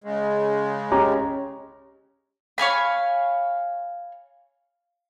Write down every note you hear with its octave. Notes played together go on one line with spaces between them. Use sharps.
C#3 G#3
C#4 G4 A#5
C#5 F5 G#5 B5